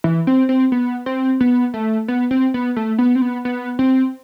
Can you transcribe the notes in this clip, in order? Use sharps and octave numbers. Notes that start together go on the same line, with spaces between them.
E3
C4
C4
B3
C4
B3
A3
B3
C4
B3
A3
B3
C4
B3
B3
C4